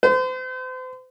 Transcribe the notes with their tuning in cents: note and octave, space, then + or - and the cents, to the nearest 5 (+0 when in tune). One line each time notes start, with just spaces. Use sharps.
C5 -40